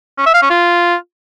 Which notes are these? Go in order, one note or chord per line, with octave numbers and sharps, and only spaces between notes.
C#4
E5
F5
C#4
F4